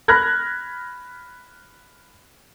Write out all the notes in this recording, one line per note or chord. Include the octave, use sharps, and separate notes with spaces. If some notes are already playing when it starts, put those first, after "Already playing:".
B5 F6 F#6 G#6 A#6